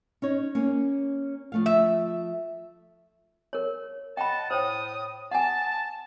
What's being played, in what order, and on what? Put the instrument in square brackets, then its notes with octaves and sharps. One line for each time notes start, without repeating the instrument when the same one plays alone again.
[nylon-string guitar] C#4 D#4 C#5
A#3 C#4
F3 A3 F5
[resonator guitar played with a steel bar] E5
[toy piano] A#4 C#5
[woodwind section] D#5 F#5 A5 [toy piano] G5 B5
[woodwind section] A2 D#6 [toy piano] C5 C#5 G5
[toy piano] F#5 G#5 [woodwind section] A5